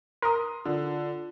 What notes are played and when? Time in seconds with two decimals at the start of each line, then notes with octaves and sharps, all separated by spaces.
0.22 A#4 C6 D#6
0.66 D3 F4